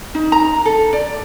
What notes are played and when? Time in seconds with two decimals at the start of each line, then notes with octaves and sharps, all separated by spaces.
0.15 D#4
0.32 A#5
0.65 A4
0.93 D5